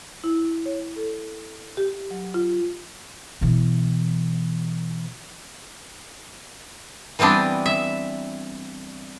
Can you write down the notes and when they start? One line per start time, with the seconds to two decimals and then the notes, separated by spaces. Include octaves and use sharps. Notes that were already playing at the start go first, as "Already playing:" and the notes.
0.24 E4
0.66 C#5
0.96 A4
1.77 G4
2.11 F#3
2.34 F4
3.41 B2 E3
7.19 E3 G3 B3 C4 D4
7.66 E5